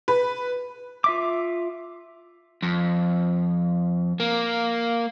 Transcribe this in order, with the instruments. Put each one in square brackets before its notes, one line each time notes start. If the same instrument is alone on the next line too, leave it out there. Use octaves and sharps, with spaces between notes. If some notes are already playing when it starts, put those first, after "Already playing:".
[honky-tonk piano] B4
[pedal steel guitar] F4 E5 D6
[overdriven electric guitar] F2
A#3